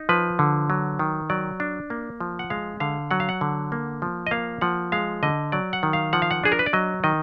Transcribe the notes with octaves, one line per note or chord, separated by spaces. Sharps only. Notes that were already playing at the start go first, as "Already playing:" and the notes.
Already playing: D#4
F3 B4
D3
F#3
D#3
F#3 D5
D4
A#3
F3
F#5
G#3 F5
D3 F5
F#3 F#5
F5
F#5
D3
A#3
F3
D#5
A#3 F5
F3 F#5
G#3 F5
D3 D#5
F#3 D5
F#5
D#3
F5
F3 F#5
F5
F#5
D4 G#4
A#4
B4
D5
F#3 D#5
D#3 D#5